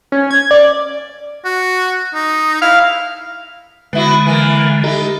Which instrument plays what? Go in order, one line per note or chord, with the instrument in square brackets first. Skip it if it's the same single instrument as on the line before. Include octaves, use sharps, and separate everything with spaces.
[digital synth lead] C#4
G#6
D5
[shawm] F#4
D#4
[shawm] E4 [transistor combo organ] F5
[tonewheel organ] D3 G#3 [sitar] B3 E4 F#4
[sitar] E3 A#3
[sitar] D#4 E4 [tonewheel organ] G4 A4